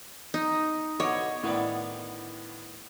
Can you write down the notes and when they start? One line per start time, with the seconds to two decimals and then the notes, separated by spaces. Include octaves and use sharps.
0.34 D#4
1.00 B2 D3 C#5 D#5 D6
1.43 A2 D3 D#3 B3 D5